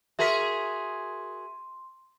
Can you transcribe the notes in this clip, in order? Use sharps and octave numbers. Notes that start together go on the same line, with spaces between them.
F#4 G#4 A#4 E5 C6 B6